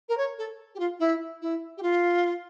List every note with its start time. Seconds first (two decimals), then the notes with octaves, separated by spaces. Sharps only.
0.08 A#4
0.17 C#5
0.38 A4
0.74 G4
0.79 F4
0.99 E4
1.41 E4
1.77 G4
1.82 F4